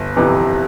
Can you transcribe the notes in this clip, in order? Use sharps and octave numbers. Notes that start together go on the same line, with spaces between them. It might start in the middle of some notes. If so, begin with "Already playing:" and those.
Already playing: G1
F2 C3 E3 B3